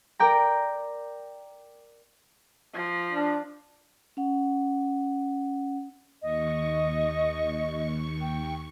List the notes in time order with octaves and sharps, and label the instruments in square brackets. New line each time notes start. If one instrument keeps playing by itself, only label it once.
[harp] A#4 D5 G5 A#5
[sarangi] F3
[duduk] D4
[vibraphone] C#4 F#5
[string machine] D#2 C#6 [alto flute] D#5
[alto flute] G5